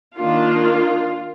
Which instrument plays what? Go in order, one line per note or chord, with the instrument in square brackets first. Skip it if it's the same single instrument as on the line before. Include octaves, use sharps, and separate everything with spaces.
[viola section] D#3 A#3 D4 F4